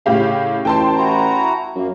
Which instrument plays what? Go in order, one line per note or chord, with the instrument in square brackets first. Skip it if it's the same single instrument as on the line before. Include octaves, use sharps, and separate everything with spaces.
[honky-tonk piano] A2 G4 F5 [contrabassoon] C#3
[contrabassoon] A1 [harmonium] A3 [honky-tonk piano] G5 A5 C6
[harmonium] E4 F#4 A#5
[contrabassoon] F#2 [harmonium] A#3